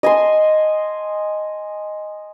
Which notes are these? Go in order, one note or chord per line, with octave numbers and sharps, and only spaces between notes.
D#5 G#5 A5 C6